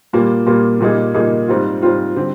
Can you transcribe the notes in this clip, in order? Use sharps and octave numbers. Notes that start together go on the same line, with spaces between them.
A#2 G3 A#3 F4
A#2 G3 A#3 F4
A#2 G3 A#3 D#4 G#4
A#2 G3 A#3 D#4 G#4
G#2 G3 C4 F4
G#2 G3 C4 F4
D3 G3 C4 G4